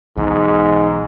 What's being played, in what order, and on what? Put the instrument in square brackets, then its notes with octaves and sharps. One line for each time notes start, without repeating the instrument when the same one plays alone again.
[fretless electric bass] B1 B2 E3 [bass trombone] G#2